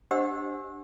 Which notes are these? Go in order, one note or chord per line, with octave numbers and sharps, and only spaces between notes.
D4 G4 C5 D#5 F#5 E6